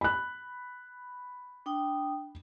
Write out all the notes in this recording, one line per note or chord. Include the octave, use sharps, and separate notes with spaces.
B5 F#6
D4 G5 D#6